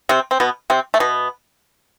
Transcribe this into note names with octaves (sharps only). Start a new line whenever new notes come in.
C3 C4
C4
B2 B3
C3 C4
A3
B2 B3